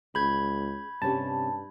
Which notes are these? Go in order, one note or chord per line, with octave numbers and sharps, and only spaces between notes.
C#2 G#4 B5 G6 G#6
G2 C3 C#4 G4 A5